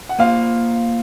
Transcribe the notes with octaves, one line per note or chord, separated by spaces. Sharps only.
F#5
A#3 F4 C5 F5